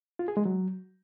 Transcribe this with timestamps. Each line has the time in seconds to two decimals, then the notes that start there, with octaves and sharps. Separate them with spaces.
0.19 F4
0.28 G#4
0.37 G#3
0.45 F#3